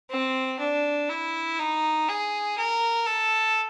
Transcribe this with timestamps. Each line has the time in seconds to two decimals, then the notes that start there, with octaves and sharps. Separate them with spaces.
0.11 C4
0.60 D4
1.10 E4
1.60 D#4
2.09 G#4
2.58 A#4
3.07 A4